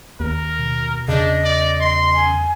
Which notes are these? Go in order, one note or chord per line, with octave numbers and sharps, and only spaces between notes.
D#2 A#4
B2
E2 C#3 D4 D#5
D5
C6
G#5